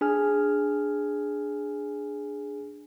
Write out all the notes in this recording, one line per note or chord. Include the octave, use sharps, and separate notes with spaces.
D4 G#4 G#5 F6